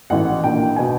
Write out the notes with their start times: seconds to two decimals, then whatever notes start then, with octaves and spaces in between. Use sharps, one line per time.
0.10 A1 A2 E3 F#5
0.44 A#1 A#2 G5
0.76 B2 G#5